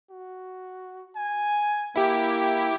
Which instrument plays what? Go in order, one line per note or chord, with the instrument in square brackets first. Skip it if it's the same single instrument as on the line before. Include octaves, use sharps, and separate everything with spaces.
[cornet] F#4
G#5
[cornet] A#3 [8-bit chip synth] E4 G4